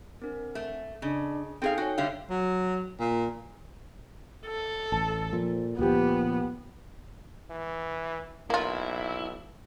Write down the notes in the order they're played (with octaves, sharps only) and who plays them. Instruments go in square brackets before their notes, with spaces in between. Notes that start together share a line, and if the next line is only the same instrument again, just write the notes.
[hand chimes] C4 D4 [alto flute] A#4
[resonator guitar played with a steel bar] A3
[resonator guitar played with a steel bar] C#3 [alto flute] D4 [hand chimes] D#5
[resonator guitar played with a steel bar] C4 G#4 F5 [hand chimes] D#4 A4 G5 [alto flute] G#5
[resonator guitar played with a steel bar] F#4 [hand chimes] C#5 G5
[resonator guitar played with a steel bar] D3 G3 F5 [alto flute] E5
[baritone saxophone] F#3
A#2
[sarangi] A4
[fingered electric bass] A1 [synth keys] A5
[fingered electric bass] A#2 [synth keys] F3
[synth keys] D2 G4 [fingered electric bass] A#2 F3 [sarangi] B3
[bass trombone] E3
[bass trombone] B1 [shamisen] A#3 F4 [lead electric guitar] E4